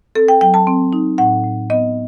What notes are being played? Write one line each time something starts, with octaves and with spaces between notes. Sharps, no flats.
C4 A4
G5
F#3 G5
A5
C4
D#4
A2 F#5
A2
B3 D#5